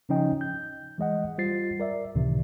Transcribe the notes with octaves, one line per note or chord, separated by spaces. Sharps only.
C#3 F3 C#4 D#4 D#5 G5
G6
E3 G#3 D#5 F#5
G3 F4 C5 A6 C7
A#4 D5 E5
C#2 A2 C3 D#3 E3